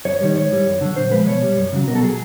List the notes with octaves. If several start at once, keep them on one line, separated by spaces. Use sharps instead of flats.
F#2 C#5
D#3 G3 C#5
G#2 C#5
E3 G3
F#2
D3 F#3
A#2 C5
F3 G#3 B4
B2 C#5
G3
F#2
C#3 F#3
B2 A#4
A4
F#3 G#4